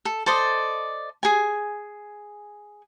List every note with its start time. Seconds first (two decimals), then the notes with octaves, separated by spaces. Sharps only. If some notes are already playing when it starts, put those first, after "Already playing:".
0.05 A4
0.26 A4 C5 D5 D#5
1.23 G#4 G#5